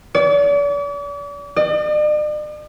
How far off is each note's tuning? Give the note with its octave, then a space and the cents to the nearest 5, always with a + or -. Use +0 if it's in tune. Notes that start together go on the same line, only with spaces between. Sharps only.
D5 -40
D5 +45